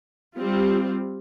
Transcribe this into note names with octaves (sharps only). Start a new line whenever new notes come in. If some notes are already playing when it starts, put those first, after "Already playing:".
G3 C4 F4